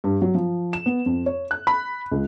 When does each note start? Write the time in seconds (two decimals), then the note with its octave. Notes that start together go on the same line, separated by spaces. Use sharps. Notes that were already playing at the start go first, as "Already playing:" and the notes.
0.04 G2
0.22 F#3
0.34 F3
0.73 E7
0.86 B3
1.06 F2
1.26 C#5
1.51 F#6
1.67 B5
2.11 C#2